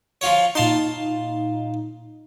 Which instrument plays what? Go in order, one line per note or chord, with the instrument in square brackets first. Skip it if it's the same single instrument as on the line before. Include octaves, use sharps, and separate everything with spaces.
[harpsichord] F3 F4 C#5
[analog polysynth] A#2 D#4 [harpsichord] F4 A5 C6